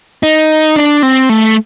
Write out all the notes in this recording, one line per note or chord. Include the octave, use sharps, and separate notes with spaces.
D#4
D4
C4
A3